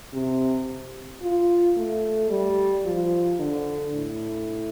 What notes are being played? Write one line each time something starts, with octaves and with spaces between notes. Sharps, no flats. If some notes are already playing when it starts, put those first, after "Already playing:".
C3
F4
A3
G3
F3
D3
A2